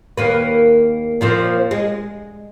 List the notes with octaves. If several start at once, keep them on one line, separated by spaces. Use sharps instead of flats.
D#2 A#3 B4
A#2 F3 C4
G#3